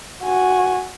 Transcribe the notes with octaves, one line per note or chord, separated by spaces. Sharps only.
F#4 G#5